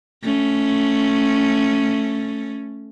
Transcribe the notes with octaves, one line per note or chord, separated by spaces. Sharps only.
A3 C#4